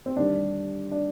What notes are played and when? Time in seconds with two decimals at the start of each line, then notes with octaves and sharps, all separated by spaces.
0.06 C4
0.16 D#2 D3 G3 D4
0.91 D4